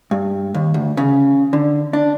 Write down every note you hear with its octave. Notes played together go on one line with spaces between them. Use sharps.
G2
D#2
D2
C#3
D3
D4